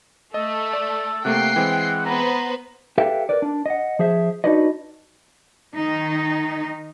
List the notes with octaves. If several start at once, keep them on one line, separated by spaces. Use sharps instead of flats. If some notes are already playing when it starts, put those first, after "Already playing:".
A3 A4 D#5
D5
C3 A3 A#3 F#5 G5 C7
E3 G#3 C4
B3 B4 C5 A#5
G4 A4 B4 E5 F5 G5
A#4 B4 D5
D4
D#5 F#5
F3 G#4 C5 E5
D4 D#4 F#4 B4 D5 D#5
D#3 D#4